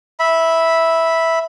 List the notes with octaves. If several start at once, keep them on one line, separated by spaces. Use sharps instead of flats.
E5 B5